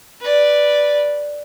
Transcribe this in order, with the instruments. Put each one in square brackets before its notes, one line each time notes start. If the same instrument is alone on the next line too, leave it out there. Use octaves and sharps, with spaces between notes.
[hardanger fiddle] B4 D5